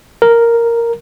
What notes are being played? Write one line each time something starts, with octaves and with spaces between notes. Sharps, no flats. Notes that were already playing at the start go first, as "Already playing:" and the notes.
A#4